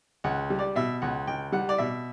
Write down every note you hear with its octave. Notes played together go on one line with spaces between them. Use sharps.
C#2 F#5
G3
D5
B2 E5
C#2 F#5
C#2 G5
G3 F#5
D5
B2 E5